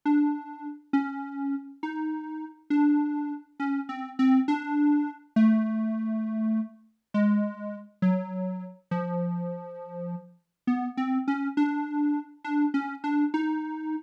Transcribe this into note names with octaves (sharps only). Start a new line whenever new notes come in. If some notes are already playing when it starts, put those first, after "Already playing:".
D4
C#4
D#4
D4
C#4
C4
C4
D4
A3
G#3
F#3
F3
B3
C4
C#4
D4
D4
C#4
D4
D#4